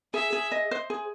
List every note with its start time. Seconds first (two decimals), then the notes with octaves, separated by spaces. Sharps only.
0.14 G#4 E5
0.33 G#4
0.52 D#5
0.71 C5
0.90 G#4